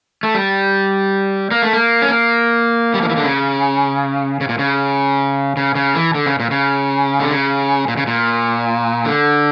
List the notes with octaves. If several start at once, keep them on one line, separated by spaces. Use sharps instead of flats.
A3
G3
A#3
A3
A#3
C#4
A#3
G3
F3
E3
D3
C#3
C#3
A#2
C#3
C#3
C#3
E3
D3
C#3
A#2
C#3
D3
C#3
A#2
C#3
A#2
D3